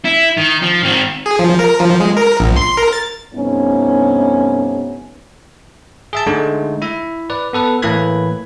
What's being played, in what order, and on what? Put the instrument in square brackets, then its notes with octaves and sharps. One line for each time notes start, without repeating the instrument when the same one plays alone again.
[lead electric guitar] E4
D#3
F3
D#3 C4
[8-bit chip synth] G#4
F3
A#4
F3
G#3
A#4
A#1
C6
A#4
A6
[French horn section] G2 C3 A3 B3 C#4 D#4
[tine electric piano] G#4 E5 A5
D3 G#3 A3 D#4
E4 E5
B4 D5
B3 A4 B4
A2 E3 A#3 B4 B5 G#6